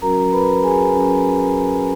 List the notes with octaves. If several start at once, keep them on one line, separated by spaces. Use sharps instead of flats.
F#3 C#4 F#4 A#4 A#5
B4 B5
G#4 G#5
F#3 C#4 F#4